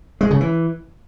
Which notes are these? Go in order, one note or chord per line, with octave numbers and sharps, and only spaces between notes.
G#3
C#3
E3